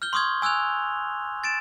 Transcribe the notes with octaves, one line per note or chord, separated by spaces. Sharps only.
F6 G6 G7
C6 C#6 D#6 F6 G#6
G#5 E6 F#6 G#6 F7
A6 D7 E7